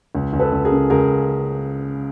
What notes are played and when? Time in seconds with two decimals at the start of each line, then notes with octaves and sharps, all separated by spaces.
0.15 C#2
0.33 C#2
0.40 A4 B4
0.52 C#2
0.65 G#4 A#4
0.72 C#3
0.90 C#2 G#4 A#4